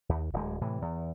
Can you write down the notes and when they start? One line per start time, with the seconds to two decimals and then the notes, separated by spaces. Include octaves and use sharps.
0.09 D#2
0.33 D1 G#3
0.61 A2 C3 E3
0.82 E2